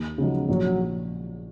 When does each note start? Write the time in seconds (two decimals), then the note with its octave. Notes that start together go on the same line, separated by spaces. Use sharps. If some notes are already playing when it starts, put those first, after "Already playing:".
Already playing: D#2
0.18 C#3 F3 F#3 G#3 D#4
0.48 A#1 F#3